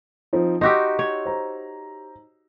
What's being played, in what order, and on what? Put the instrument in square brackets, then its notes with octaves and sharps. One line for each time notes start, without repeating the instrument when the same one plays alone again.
[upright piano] F3 C4 D#4
[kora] D#4 F#4 G4 [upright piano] C6 E6
[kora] C#5
[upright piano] C5 A#5